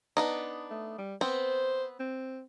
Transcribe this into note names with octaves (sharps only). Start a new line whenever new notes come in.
B3 D4 D#4
A3
G3
B3 C4 C5
C4